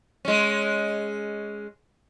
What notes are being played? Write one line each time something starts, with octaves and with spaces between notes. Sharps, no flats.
G#3 C#4